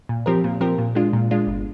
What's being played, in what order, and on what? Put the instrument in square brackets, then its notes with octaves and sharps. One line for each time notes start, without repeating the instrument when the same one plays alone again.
[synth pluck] A#2
F3 C4 G4 A#4
A#2
F3 C4 G4 A#4
A#2
G#3 D4 F4
A#2
G#3 D4 F4
G1